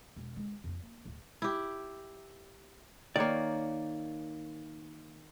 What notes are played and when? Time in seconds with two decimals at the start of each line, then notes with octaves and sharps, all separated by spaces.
0.16 E1
0.36 D3 G#3
0.64 F2 C4
0.82 A#3
1.05 D1 D2
1.42 E4 G4
3.16 D#3 A#3 C#5 D5